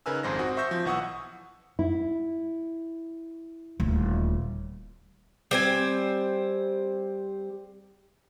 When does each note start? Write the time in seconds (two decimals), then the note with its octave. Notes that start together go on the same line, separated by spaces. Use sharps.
0.06 C#3 D#4 A#4 B4 G#5 E6
0.23 G#1 F2 G#2 C5 G#5 A#6
0.39 C4 F#4 D#6
0.57 C5 E5 C#6 E6 G6 A#6
0.71 F3
0.85 B1 E3 F#5 C#6 D#6 E6
1.79 E4
3.80 D#1 D2
5.51 G3 C4 G#5